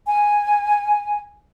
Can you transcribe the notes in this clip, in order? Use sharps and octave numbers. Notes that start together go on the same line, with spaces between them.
G#5